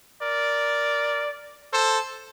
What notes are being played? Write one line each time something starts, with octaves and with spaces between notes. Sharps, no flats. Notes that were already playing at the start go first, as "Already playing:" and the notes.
A#4 D5
A4 C5